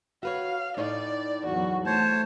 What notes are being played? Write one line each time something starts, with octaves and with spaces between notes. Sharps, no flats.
F#4 B4 C#5 F5
A2 D#4 D5
E2 F#3 F#4
A3 C5 C#5 A5